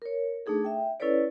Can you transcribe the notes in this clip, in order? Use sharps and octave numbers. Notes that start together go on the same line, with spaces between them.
A#4 C#5
A3 D4 D#4 G#4 A4
E5 G5
C#4 E4 A4 B4 C#5 D5